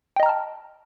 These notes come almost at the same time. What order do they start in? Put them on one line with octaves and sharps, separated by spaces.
G5 D#5 A#5 F6 A5